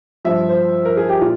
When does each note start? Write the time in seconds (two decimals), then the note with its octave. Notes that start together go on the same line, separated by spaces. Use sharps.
0.25 G2 F3 E5
0.49 C5
0.85 A#4
0.97 G#4
1.09 G4
1.21 A#2 F4